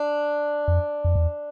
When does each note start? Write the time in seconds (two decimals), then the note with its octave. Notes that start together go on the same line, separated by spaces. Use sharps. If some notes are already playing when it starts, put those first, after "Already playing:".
Already playing: D4
0.68 F2
1.05 F2
1.16 E2